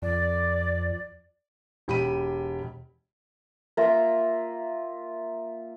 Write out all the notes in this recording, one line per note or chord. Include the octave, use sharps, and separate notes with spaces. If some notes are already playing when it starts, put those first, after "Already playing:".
F2 D5
E1 G4 B5 D#7
A#3 F4 E5 A#5